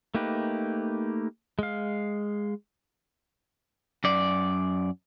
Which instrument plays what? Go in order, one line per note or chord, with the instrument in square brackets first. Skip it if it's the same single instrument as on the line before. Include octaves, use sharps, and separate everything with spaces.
[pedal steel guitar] A3 A#3 D#4 G4 B4
G#3 F5
[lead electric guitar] F#2 D5